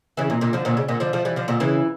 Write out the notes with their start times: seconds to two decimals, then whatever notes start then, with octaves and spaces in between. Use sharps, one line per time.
0.17 C#3 E3
0.30 A#2
0.41 A#2 D3
0.53 D3 F3
0.65 A#2 D3
0.77 C#3
0.88 A#2 D3
1.00 D3 F3
1.13 F3 A3
1.25 E3 G3
1.36 D3 F3
1.48 A#2 D3
1.60 C#3 E3